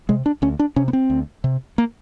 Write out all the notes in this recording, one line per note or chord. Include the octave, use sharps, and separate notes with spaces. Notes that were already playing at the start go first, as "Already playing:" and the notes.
C3 G#3
D4
D2 C#4
D4
C3 C#4
B3
C4
D2
C3
A#3